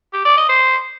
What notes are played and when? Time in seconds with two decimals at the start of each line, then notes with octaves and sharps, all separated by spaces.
0.13 G4
0.25 D5
0.37 D#5
0.49 C5